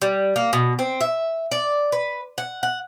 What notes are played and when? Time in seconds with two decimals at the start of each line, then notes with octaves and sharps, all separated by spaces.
0.02 G3
0.36 A#3
0.53 B2
0.79 C4
1.01 E5
1.51 D5
1.92 B4
2.38 F#5
2.63 F#5